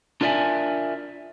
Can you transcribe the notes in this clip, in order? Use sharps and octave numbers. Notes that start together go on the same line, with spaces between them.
D4 F4 A#4 D5 E5 G#5